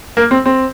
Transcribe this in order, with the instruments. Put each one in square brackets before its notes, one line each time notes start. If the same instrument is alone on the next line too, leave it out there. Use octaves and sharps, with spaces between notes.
[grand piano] A#3
C4
C4